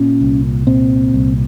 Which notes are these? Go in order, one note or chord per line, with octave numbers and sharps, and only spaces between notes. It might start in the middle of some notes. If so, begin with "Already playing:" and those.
Already playing: A#2 C#4
C2
A#2 C4
C2